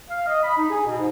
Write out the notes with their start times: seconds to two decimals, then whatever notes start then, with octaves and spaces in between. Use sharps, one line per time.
0.08 F5
0.27 D#5
0.43 B5
0.56 D#4
0.69 G#4
0.84 B2
0.98 G#2